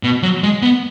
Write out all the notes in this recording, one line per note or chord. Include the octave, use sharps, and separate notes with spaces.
B2
F#3
G#3
B3